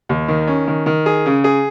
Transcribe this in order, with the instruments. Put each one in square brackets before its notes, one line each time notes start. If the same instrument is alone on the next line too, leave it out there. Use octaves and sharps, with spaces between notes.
[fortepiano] D#2
D#3
C#4
D#3
D#3
G#4
C#3
G#4